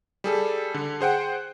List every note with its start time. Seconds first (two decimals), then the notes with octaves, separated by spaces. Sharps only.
0.24 G3 G#4 A4
0.74 D3
1.01 G#4 C5 F#5 G5